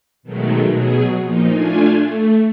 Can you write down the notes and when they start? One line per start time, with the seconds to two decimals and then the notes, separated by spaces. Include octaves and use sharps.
0.23 B2 D#3 F#3 G#3 A3
0.68 B2 F#3 G#4
1.20 A#2 F3 D#4
1.48 A3 D4 F4 G#5
2.00 A3